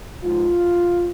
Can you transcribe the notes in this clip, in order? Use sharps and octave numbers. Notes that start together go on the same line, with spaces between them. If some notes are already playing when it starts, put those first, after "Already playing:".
G#2 F3 G#3 F4